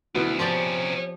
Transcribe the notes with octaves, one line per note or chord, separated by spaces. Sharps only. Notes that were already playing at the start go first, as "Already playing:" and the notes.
D2 B2 B3 E4
C3 F3 C#4 G4 C5 D5